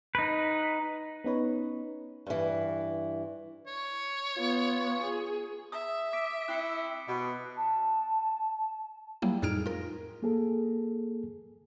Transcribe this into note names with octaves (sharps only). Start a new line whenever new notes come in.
D#4 B4
B3 C#4 D#4 B4 C#5
G2 E3
C#5
B3 F4
G#4
E5 D#6
D6 B6 D7
C4 E4 F#6 C7 C#7
B2
A5
F#3 G3 A#3 E4
F2 A2 D#4 G#4 F6 D7
F4 A#4
A#3 G#4 A4